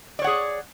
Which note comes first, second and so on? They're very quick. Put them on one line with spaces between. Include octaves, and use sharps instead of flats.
D5 C#5 F#5 G#4